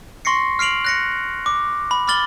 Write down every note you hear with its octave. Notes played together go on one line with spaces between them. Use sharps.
C6 C#6 A#6 C7 C#7
F6 C7 D7 F7 F#7
F#6 A#6 C#7
D6
B5
B5 D6 F6 A6 F#7 G7